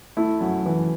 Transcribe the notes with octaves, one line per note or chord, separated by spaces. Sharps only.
A3 E4
F#2
E3